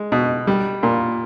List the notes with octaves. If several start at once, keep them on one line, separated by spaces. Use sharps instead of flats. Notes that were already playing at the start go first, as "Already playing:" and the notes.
Already playing: G#3
B2
G3
A#2